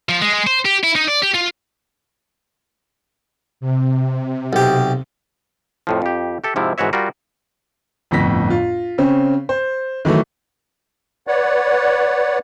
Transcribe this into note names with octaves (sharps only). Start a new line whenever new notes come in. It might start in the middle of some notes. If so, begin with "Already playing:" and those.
F3
G#3
G#3
C5
G4
E4
D#4
D5
G4
F4
C3
B1 G4
F2 A2 F3
F2 G4
G4 A4 E5
G#2 C3 F3 E4
G#1 G#2 E3 F#4 C#5 E5
G3 F4 F#4 A#4
G1 F2 A2 A#6 B6
F4
C#3 C4 C#4
C5
D#3 E3 F#3 A3
B4 C#5 D5 F#5